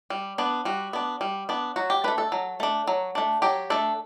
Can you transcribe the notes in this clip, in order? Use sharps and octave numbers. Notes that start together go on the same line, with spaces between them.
G3
B3 D4
G3 F#4
B3 D4
G3
B3 D4
F#3 F#4
G4
A3 D4 B4
A4
F#3
A3 D4
F#3
A3 D4
F#3 G4
A3 D4 A4